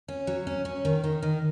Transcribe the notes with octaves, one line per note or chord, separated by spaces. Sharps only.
C#4
F#3
C#4
C#4
D#3
D#3
D#3